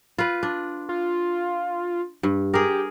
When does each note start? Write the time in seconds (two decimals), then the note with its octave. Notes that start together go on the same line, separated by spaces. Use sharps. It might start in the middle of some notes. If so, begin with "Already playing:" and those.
0.18 F4 B4
0.43 D4
0.89 F4
2.23 G2
2.54 G4 G#4 A#4